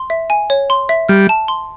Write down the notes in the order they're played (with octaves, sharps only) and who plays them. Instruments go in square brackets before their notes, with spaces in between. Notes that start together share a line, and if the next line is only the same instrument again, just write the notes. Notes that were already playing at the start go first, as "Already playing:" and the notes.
Already playing: [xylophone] C6
E5
G#5
C#5
C6
E5
[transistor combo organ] G3 [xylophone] F6
[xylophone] A5
C6